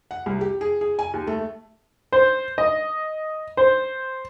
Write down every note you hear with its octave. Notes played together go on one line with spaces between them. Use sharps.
F#5
C2
G4
G#4
G#4
G#5
D#2
A3
C5
D#5
C5